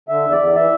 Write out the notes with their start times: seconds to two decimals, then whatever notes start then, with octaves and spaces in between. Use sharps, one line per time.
0.09 D3 E5
0.24 E2
0.32 D5
0.40 E2
0.55 E3 E5